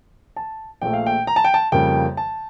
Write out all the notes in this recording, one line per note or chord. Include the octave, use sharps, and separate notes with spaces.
A5
A#1 A#2 A3 G5
F5
G5
A#5
A5
G5
A5
F2 C#3 G3 A#3 G5
A5